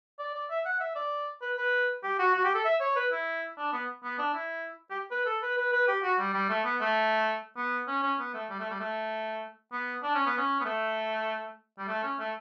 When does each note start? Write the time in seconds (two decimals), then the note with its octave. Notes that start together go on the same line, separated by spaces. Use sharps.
0.19 D5
0.34 D5
0.50 E5
0.66 F#5
0.80 E5
0.96 D5
1.42 B4
1.58 B4
2.04 G4
2.19 F#4
2.34 F#4
2.44 G4
2.55 A4
2.65 E5
2.81 C#5
2.96 B4
3.12 E4
3.58 D4
3.73 B3
4.04 B3
4.19 D4
4.34 E4
4.90 G4
5.11 B4
5.26 A4
5.42 B4
5.57 B4
5.73 B4
5.88 G4
6.03 F#4
6.19 G3
6.34 G3
6.50 A3
6.65 B3
6.81 A3
7.57 B3
7.88 C#4
8.03 C#4
8.20 B3
8.34 A3
8.50 G3
8.60 A3
8.71 G3
8.80 A3
9.72 B3
10.03 D4
10.15 C#4
10.26 B3
10.38 C#4
10.61 B3
10.65 A3
11.79 G3
11.88 A3
12.03 C#4
12.19 A3